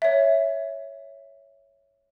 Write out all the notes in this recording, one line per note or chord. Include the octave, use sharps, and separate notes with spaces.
C#5 E5